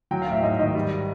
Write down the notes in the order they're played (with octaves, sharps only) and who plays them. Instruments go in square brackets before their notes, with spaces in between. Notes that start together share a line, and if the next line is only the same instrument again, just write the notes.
[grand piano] F#3 G5
F5
A1 E5
G#2 D#5
D#3 D#5
G3